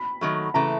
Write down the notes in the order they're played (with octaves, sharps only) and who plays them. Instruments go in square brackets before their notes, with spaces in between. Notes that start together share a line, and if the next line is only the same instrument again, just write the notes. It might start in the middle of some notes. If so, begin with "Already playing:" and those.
Already playing: [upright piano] B5
[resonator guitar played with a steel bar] D#3 F#3 A3
[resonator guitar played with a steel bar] C#3 E3 A3 [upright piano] A#5